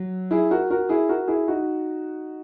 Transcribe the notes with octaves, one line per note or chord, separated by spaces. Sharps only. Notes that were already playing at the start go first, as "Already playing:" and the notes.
Already playing: F#3
E4 G#4
F#4 A#4
F#4 A#4
E4 G#4
F#4 A#4
E4 G#4
D#4 F#4